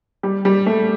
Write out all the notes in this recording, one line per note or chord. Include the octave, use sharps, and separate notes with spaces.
G3
G3
A3